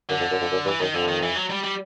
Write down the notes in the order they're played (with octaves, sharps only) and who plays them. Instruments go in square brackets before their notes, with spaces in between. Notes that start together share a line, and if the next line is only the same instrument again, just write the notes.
[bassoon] F#2 [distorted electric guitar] D3
[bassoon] F2
F#2
F2
F#2
[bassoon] G2 [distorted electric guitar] E3
[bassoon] F#2 [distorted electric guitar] D#3
[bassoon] F2 [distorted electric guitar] D3
[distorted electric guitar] D#3
E3
F#3
G3
G3